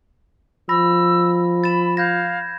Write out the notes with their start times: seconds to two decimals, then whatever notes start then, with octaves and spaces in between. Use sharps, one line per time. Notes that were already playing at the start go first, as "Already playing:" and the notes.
0.69 F3 B5 E6 A#6
1.64 B5 A6 E7
1.97 F5 G6 G#6 A#6